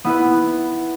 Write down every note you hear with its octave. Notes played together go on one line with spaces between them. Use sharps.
B3 E4 B4